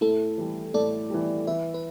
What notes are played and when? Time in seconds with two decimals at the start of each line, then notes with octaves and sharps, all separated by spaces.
0.01 A2 E4 A4
0.38 E3 G3
0.74 A2 A4 D5
1.10 E3 G3
1.47 E3 B4 E5
1.74 B4